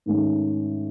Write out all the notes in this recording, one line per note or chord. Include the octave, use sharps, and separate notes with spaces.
G#2 D#3 A3 C#4